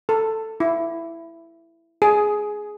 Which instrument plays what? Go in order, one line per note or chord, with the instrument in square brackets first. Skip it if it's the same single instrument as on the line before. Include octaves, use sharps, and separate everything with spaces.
[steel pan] A4
E4
G#4